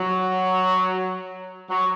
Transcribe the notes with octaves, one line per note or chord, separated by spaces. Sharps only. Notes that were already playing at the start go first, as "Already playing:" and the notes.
Already playing: F#3
F#3